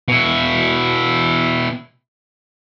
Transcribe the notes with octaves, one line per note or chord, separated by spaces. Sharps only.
B2 E4